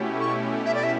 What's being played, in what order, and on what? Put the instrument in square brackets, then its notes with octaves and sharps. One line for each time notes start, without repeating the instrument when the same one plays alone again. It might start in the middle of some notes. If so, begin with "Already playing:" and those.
Already playing: [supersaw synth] B2 A3 C#4 E4 G4
[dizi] C#6
E5
D5
E5